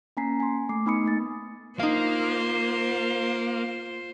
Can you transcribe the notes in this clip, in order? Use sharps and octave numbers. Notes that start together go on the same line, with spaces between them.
A#3 C#4 G#5 A#5 B6 C7
G#5 C6
A3 D6 C7
B3 D#4 G#5 B5 D#6 C#7
A3 A#3 A6
A#3 D#4 F4 C5 F5